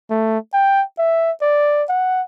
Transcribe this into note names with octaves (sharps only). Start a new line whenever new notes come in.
A3
G5
E5
D5
F#5